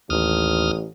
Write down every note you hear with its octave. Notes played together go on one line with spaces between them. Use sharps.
A1 D#2 D#6 F6